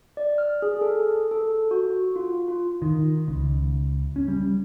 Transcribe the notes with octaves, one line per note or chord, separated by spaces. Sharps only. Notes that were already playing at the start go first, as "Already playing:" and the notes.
D5
F6
G#4
A4
A4
F#4
F4
F4
D#3
C#2
C#4
G3